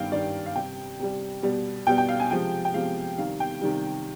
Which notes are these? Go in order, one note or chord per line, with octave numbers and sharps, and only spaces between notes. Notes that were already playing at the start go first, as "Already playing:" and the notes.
Already playing: G2 D#3 G3 F5 G5
G2 D#3 G3 D5
F5
C3 G3 G5
C3 G3
B2 G3
B2 G3 G5
G5
F5
G#5
C3 F3 G#3 G5
G5
C3 F3 G#3 F5
C3 D#3 G3 F5
G5
C3 D#3 G3